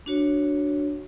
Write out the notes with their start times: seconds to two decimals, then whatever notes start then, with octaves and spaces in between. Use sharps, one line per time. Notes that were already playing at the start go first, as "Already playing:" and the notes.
0.06 D4 F#4 C#5